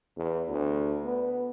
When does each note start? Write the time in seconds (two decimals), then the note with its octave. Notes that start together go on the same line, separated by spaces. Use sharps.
0.17 E2
0.48 D2
1.05 B3